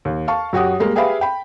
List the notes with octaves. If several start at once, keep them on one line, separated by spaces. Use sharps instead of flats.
D#2
F5 A5 C#6
F#2 F#4 G4 F#5 D#6
G3 G#3 A#3
G4 G#4 B4 E5 F5 B5
G5 B5